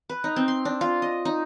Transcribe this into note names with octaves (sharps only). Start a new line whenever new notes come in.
B4
D#4
C4
C6
D4
F4
D#5
D#4